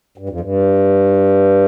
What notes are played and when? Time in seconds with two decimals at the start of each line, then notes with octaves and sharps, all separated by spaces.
0.18 G2
0.29 F2
0.40 G2